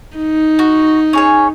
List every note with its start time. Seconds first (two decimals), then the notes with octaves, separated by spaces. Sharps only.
0.17 D#4
0.59 F#4
1.13 C#4 G#4 C#5